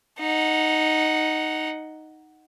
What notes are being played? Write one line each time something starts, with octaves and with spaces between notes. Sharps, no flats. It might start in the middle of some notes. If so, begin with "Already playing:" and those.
D#4 F#5